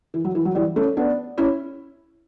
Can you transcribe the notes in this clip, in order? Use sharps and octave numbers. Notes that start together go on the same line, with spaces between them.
E3
F#3
E3
F#3
E3 G3
A3 C#4
B3 D4
C#4 E4